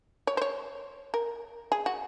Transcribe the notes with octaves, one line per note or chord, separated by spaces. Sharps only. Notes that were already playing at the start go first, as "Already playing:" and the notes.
C#5
C5
C#5
A#4
G#4
F#4